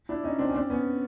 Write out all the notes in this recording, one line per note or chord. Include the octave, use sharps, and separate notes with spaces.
D4 E4
C#4 D#4
C4 D4
C#4
C4 D4
B3 C#4